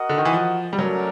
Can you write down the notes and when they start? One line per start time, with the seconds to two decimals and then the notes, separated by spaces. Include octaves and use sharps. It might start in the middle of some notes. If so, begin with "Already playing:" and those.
Already playing: F#4 A#4 D#5 F#5
0.09 D3
0.18 D#3
0.25 E3
0.33 F3
0.73 G3
0.79 F#3 A3 C#4 F#4 A#4 D5